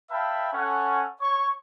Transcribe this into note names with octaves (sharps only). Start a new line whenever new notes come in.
B4 E5 F5 G5 A5 B5
C#4 A4 F#5
C#5 C#6